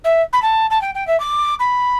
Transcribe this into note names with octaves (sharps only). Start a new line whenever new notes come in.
E5
B5
A5
A5
G5
G5
E5
D6
B5